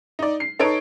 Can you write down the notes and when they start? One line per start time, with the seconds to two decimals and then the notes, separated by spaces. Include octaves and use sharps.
0.19 D#4 D5
0.40 C7
0.59 D#4 A4 B4 C#5 C#6 D7